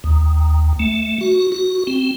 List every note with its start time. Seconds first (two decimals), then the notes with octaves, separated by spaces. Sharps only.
0.04 D#2
0.79 A3
1.21 F#4
1.52 F#4
1.87 C4